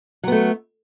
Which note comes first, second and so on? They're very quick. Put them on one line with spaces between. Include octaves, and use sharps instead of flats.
F#3 B3 A3